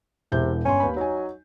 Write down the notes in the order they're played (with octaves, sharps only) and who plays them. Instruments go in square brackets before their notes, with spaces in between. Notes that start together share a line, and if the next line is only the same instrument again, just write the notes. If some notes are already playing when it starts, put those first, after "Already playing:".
[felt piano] E1 E3 G6 [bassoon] C3
[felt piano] G1 C6 [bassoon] C#4
[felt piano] D#2 B4 B5
[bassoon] F#3 [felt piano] D#4 C#5 G#5